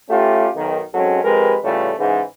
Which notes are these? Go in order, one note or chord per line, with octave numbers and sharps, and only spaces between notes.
A3 C#4 E4 F4 G4
B1 D#3
G#2 F#3 G#3 C4 C#4 A4
F2 G#3 G4 A#4 B4
A2 C#3 E3 G3 A3 F4
G#2 C#3 E3